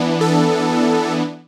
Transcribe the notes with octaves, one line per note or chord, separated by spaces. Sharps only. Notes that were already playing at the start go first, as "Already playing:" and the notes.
Already playing: E3 B3 D4
A4